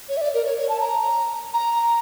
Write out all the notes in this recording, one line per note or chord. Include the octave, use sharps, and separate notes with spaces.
C#5
E5
D5
A#4
C#5
C#5
A5
A#5
A#5